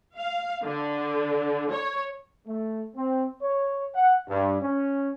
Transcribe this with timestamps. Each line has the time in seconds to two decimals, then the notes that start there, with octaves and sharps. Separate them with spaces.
0.17 F5
0.65 D3
1.72 C#5
2.47 A3
2.96 C4
3.42 C#5
3.94 F#5
4.28 G2
4.61 C#4